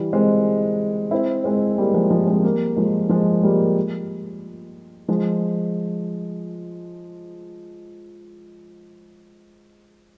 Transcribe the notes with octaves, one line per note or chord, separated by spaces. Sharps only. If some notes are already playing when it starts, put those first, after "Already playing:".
Already playing: E3 G3
G#3 C4
C4 E4
G#3 C4
G3 A#3
F3 G#3
F3 G#3
G#3 C4
G3 A#3
F3 G#3
F3 G#3
G3 A#3
F3 G#3